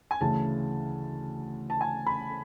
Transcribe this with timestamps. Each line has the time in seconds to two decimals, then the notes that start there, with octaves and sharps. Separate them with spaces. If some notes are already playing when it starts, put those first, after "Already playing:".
0.11 G#5
0.21 D2 C#3 E3 A5
1.70 A5
1.81 G#5
2.06 B5